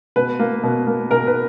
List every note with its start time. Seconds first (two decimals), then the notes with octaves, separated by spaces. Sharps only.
0.16 B2 B4
0.39 A#3
0.63 B2
0.87 A#3
1.11 B2 A#4
1.27 B4